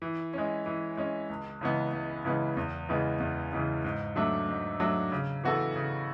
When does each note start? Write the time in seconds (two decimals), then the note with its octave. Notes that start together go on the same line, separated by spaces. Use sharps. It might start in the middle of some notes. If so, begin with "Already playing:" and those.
0.02 E3
0.33 G#3 C#4
0.66 E3
0.97 G#3 C#4
1.29 C#2
1.61 C#3 E3 G#3 B3
1.93 C#2
2.25 C#3 E3 G#3 B3
2.57 E2
2.89 C#3 E3 G#3 B3
3.20 E2
3.53 C#3 E3 G#3 B3
3.85 G#2
4.16 F#3 A3 D4
4.49 G#2
4.80 F#3 A3 D4
5.12 C#3
5.43 E3 B3 F#4 A4
5.76 C#3